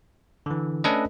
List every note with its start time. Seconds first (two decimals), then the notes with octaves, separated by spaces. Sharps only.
0.46 D3 E3
0.84 A3 C#4 D4 A4 B4 D#5